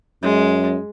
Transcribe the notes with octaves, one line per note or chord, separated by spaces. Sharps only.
F#2 G#3